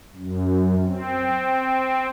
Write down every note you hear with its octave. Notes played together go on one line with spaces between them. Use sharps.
F#2
C4